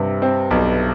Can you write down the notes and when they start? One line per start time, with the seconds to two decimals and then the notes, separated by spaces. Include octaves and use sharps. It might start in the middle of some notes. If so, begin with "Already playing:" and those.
Already playing: G2 C3
0.22 C4
0.51 B1